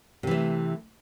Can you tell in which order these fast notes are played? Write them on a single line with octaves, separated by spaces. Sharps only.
C3 E3 A3